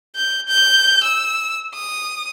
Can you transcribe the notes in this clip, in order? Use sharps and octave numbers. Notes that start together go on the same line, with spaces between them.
G6
G6
E6
D#6